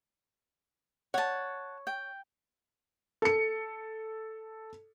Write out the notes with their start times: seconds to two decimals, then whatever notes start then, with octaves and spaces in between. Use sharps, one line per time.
1.14 C#5 F#5 A5
1.87 G5
3.22 A4 C#7